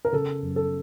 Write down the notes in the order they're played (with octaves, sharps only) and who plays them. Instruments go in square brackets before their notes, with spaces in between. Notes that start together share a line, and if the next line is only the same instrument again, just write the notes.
[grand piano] A#4
C#3 A4
F#1
A4